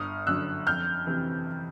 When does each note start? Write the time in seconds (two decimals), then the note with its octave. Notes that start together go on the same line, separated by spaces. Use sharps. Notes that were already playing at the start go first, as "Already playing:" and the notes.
Already playing: G1 D#6 F6
0.27 F#2 D3 E6 F#6
0.66 F2 F6 G6
1.07 C3 E3